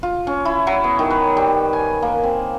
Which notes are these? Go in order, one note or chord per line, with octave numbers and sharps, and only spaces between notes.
F4
C#4
E4
F#3
B3
D#3
B4
G3
G#5
A#3
C4